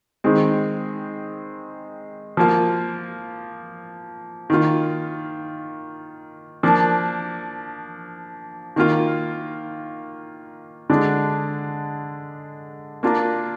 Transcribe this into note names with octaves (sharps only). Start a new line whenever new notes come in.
D#3 G#3 C4
F3 A#3 F4
D#3 A#3 F4
F3 A#3 D4
D#3 A#3 F4
D3 G#3 D4
A#3 D4 F4 A#4